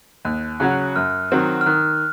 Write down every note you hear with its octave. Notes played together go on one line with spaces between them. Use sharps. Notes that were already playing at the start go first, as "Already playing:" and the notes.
D#2 F#6
C#3 F#3 C#4 F#4 F#6
F#2 F6
D#3 F#3 C4 F#4
F6
D#3 F#6